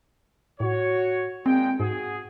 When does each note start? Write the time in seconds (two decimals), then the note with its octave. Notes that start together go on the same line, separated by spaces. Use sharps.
0.60 A2 F#4 C#5
1.46 A#2 G#3 C4 G5
1.80 G#2 F#4 G#4